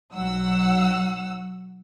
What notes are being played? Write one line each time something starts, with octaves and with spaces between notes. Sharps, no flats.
B1 F#3 F#5 E6